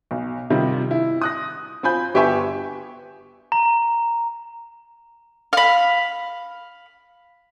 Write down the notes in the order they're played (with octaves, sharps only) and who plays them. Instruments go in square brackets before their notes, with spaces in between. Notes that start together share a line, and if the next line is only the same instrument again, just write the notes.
[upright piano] B1
C3 D#3 G3 F4
E4
D#6 F#6 A#6
C4 F4 G#5 B5 G6
G1 G4 B4 E5 G#5 C#6
[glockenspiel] A#5
[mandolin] F5 B5